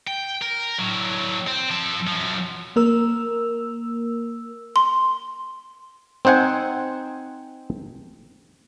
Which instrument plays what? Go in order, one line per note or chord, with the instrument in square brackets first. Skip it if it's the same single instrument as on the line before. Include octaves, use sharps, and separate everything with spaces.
[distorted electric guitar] G5
A#4
A2 F#3
C4
F3 A4
F#2 F3
[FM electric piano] A#3 A#4 E6
[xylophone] C6
[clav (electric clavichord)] C4 D#4 C5 F#5 G#5